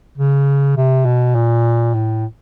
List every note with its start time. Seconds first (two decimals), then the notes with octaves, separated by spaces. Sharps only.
0.18 C#3
0.77 C3
1.06 B2
1.35 A#2
1.94 A2